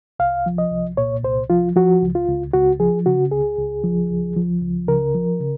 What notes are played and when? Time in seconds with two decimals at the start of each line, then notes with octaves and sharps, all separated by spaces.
0.19 C2 F5
0.46 F3
0.58 D#5
0.72 C2
0.97 A#2 C#5
1.23 C2 C5
1.50 F3 F4
1.76 F3 F#4
2.02 C#2
2.15 F4
2.28 C#2
2.53 C#2 F#4
2.80 F3 G#4
3.06 C#3 F#4
3.31 C#2 G#4
3.58 C#2
3.84 F3
4.10 C#2
4.36 F3
4.61 C#2
4.88 C#3 A#4
5.15 F3
5.40 C#3